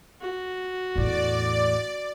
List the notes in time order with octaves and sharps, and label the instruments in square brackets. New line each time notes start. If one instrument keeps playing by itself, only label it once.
[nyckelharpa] F#4
[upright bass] E2 A2 [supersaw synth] D5